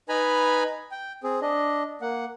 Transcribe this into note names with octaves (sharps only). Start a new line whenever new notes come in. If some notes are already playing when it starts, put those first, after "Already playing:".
D#4 B4 G#5 A#5 B5
G5
C4 G#4
D4 D#5
A#3 F#5